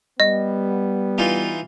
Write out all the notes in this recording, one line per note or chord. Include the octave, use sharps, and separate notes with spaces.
G3 B3 D#5
E3 D#4 F4